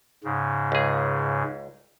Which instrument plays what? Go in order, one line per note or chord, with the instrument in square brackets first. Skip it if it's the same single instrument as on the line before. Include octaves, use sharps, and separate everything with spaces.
[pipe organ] G#2 C#3
[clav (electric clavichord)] C#2 G#4